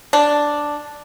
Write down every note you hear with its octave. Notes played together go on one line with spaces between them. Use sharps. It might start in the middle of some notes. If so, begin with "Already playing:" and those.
D4